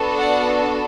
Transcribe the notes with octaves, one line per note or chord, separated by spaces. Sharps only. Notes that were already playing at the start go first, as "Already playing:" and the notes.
Already playing: B3 D4 F#4 A4
D5 F#5